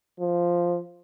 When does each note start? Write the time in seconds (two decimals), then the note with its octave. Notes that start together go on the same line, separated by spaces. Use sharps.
0.20 F3